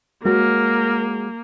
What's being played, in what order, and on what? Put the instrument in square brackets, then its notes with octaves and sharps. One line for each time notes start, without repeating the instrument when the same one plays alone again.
[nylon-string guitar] G#3 F#4 C#5 [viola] A#3 [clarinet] A#4